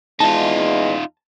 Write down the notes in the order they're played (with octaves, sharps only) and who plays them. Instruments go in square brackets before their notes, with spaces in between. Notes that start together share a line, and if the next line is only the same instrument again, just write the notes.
[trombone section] E2 G#3 [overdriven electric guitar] D#4 F4 [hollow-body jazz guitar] A5